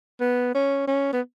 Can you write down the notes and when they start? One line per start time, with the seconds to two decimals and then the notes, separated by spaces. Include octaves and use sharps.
0.20 B3
0.55 C#4
0.87 C#4
1.13 B3